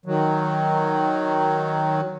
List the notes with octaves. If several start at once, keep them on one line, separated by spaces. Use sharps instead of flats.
D#3 F#3